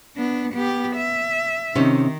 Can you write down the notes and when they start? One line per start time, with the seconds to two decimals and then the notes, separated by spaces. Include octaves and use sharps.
0.16 B3 D4
0.53 B3 G4
0.96 E5
1.75 C3 D#3 C#4 D#4